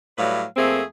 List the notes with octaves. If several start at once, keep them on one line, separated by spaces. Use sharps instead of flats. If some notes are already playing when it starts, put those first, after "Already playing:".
A2 F#3 G3 B4 F5
F2 A3 A#3 C4 G#4